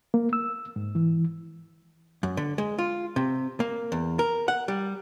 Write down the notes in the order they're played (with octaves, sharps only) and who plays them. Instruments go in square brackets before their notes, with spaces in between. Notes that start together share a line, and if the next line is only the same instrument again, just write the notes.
[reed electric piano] A#3
E6
G#2
E3
[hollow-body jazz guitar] F#2
D3
G#3
F4
C3
A#3
E2
A#4
F#5
G3